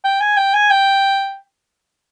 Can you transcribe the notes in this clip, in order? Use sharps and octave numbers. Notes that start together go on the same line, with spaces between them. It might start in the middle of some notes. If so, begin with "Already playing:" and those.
G5
G#5
G5
G#5
G5